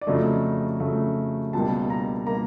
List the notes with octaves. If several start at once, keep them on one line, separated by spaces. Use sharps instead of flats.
D5
F2 C#3 F#3 A3 D#5
F2 C#3 F#3 A3
C#2 B2 G3 A#3 A5
A#5
B2 G3 A#3 A#5